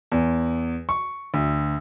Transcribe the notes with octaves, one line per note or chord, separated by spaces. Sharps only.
E2
C#6
D2